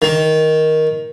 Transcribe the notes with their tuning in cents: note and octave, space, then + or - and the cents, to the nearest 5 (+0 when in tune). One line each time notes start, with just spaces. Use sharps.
D#3 +10